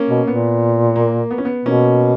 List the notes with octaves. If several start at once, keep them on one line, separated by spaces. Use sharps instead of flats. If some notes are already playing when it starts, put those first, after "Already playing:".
Already playing: A#3 C#4
B2
A#2 B3
A#3
B3
C#4
B3
B2 A#3 C#4